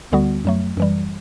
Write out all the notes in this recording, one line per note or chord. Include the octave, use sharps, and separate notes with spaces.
D2 D3 G3 B3 F#4
F#2 F#3 A3
F#2 E3 G3